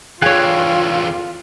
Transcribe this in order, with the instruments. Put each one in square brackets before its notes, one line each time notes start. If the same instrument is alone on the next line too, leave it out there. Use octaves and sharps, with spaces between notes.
[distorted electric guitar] E2 D3 [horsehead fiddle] F4 [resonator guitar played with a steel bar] G#4 C#5 [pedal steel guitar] F5 G5 F#6